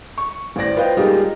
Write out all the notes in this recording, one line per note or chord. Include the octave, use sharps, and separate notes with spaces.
C#6
A1 C5 D5 A#6
F4 B4 C5 D#5 F5 G5
G3 G#3 A#3 D#4 F4 G4